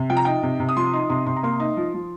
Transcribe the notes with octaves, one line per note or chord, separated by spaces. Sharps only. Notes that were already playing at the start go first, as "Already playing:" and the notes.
Already playing: C3
F3 G5
A#5
D#4 G5
C3
C3
D#6
F3 C6
D#4 C6
C3 C6
C3 C6
A#5
A#3 C6
D#4
F3
F3